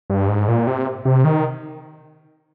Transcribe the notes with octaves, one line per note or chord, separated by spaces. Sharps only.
G2
G#2
A#2
C3
C3
D#3